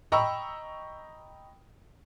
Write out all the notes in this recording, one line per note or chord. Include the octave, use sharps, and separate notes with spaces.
D#5 G5 A#5 B5 C#6 E6